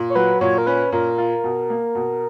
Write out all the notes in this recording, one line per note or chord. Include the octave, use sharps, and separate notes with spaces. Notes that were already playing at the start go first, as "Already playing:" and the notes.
Already playing: A#2
C#5
F#3 B4
A#2 C#5
A#4
C#4 B4
A#2 A#4
F4
B2
A#3
B2